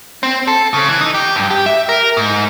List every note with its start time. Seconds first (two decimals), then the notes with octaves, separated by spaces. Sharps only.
0.23 C4
0.47 A4
0.74 C#3
0.89 E3
1.01 D#4
1.14 G4
1.36 G2
1.51 G4
1.66 E5
1.89 A#4
2.17 G#2